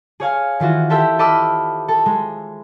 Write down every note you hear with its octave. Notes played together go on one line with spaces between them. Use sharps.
G#4 C#5 F5 G#5
D#3 E3 F4 F#4
G4 A4 C5 E5 G5
A4 D#5 B5 D6 E6 F6
A4
G#3